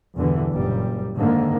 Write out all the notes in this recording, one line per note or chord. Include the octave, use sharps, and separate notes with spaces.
E2 G2 B2 D3 E3
F#1 A#2 G3
G#2 D3 D#3 G#3 A#3